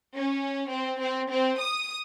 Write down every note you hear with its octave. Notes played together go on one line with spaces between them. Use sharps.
C#4
C4
C4
C4
D#6